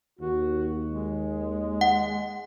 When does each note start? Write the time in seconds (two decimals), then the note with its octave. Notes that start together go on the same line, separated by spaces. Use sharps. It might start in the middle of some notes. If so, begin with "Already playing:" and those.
0.19 D#2 F#4
0.88 G#3
1.81 F#5